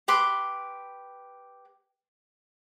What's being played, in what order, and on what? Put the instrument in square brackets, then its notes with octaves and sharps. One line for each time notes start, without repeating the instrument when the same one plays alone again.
[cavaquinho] G4 B4 C6 D6